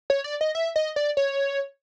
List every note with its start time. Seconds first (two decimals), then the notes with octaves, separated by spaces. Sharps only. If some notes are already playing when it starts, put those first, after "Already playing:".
0.10 C#5
0.24 D5
0.41 D#5
0.55 E5
0.76 D#5
0.96 D5
1.17 C#5